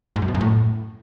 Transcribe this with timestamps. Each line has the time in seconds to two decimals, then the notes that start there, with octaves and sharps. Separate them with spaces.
0.16 G#2
0.22 F#2
0.28 B2
0.34 F#2
0.41 A2